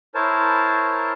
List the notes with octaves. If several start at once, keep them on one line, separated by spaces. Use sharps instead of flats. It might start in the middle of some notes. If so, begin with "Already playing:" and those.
E4 A#4 C5 C#5 A5